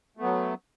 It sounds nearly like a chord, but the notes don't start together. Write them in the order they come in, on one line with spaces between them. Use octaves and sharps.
A3 B3 F#3